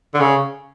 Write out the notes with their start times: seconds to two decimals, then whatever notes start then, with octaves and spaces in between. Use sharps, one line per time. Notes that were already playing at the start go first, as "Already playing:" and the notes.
0.14 D3
0.20 C#3